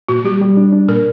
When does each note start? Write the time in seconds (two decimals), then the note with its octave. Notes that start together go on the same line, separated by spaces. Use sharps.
0.09 A#2 F#4
0.25 G3 G4
0.41 G3
0.57 D4
0.72 D4
0.88 A#2 A#4